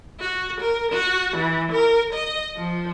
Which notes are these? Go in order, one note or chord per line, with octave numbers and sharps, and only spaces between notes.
F#4
A#4
F#4
E3
A#4
D#5
F3